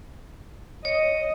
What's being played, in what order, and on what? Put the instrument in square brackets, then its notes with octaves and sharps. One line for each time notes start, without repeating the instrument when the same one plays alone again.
[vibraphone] C#5 [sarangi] D#5